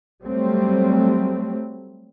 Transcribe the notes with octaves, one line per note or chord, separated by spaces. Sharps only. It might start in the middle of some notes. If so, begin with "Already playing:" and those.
F#3 G3 A3 C4